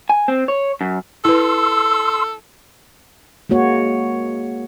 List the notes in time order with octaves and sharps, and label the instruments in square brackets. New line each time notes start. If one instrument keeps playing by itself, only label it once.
[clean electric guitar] G#5
C4
C#5
F#2
[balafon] E4 B4 [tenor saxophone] A4 [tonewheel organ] C6 E6
[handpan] G#3 A#3 F#4 C#5